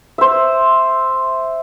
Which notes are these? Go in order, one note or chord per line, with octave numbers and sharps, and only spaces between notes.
C5 E5